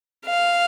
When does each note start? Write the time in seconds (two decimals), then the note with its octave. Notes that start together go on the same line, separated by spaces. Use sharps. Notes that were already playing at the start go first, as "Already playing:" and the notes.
0.25 F5